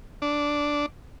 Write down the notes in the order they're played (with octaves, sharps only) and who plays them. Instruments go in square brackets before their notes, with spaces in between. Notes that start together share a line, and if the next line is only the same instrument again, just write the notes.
[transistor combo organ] D4